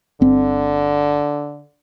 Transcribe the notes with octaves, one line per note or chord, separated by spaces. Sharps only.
G1 D3 C4